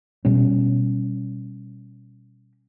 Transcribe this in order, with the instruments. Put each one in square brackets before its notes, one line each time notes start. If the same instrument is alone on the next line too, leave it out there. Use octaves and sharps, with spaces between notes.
[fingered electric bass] B2 G3 C#4